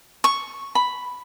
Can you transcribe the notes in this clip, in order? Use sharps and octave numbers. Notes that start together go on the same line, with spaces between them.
C#6
B5